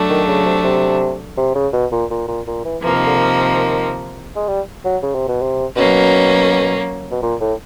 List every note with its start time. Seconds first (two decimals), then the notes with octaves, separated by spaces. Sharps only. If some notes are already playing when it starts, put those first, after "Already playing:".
Already playing: F#3 A3 D4
0.09 D#3
0.27 C#3
0.45 C3
0.64 C3
1.37 C3
1.55 C#3
1.73 B2
1.92 A#2
2.10 A#2
2.28 A#2
2.47 A#2
2.65 E3
2.83 C3 E3 F3 A#3
2.95 D#3
3.06 D3
3.17 D#3
4.36 G#3
4.48 G3
4.85 F#3
5.03 C#3
5.15 C3
5.28 B2
5.42 C3
5.75 B2 F#3 A#3 C#4
7.11 B2
7.22 A#2
7.40 A2